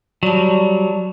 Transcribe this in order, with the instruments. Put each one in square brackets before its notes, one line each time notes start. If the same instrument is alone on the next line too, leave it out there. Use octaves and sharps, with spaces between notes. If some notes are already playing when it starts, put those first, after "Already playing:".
[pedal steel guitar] F#3 G3 [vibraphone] D5 A5